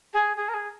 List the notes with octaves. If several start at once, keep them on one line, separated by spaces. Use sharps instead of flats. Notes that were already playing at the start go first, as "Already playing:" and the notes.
G#4
G#4
A#4
G#4